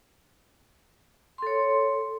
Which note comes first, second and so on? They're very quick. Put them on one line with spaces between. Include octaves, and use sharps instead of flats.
C6 A4 C#5